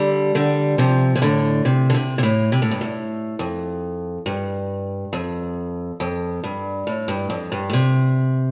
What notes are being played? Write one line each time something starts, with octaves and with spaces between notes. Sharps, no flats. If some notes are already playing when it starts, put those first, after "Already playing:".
Already playing: D3 G3
D3 G3
C3 F3
C3
A2 D3
C3
D3
C3
C3
A2
C3
A2
G2
A2
F2
G2
F2
F2
G2
A2
G2
F2
G2
A2
C3